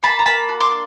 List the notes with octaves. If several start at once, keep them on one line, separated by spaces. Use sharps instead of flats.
A#3 A5 B5
A#5
A#3 A5 B5
F#4
C6 D6
D4